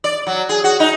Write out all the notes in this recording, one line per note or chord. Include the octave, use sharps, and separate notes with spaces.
D5
F#3
G#4
F#4
D#4